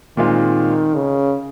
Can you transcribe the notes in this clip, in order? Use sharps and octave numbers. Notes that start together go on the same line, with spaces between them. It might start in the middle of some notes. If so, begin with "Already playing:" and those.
A#2 D#3 G#3 C4 F4
C#3